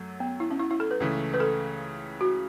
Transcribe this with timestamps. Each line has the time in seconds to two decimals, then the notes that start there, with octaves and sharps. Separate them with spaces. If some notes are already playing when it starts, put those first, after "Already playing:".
Already playing: F#2 F#3 A3
0.20 B3
0.40 E4
0.51 C#4
0.60 E4
0.71 E4
0.80 A4
0.91 B4
1.00 C#2 C#3 E3 A3
1.34 B4
1.40 A4
2.21 F#4